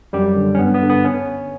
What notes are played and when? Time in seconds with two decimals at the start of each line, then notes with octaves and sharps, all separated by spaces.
0.13 F#2 G3 G4
0.37 D3
0.55 C#4
0.59 G2 B3
0.75 B3
0.83 D3
0.90 B3
1.05 C#4